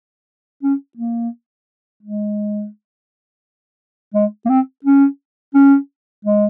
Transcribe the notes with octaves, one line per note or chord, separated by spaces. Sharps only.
C#4
A#3
G#3
G#3
A#3
C4
C#4
C#4
G#3